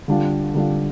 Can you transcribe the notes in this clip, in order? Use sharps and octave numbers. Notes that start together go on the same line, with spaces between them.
D3 G3 D4 F4
D3 G3 D4 F4